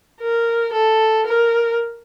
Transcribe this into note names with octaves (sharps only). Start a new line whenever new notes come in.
A#4
A4
A#4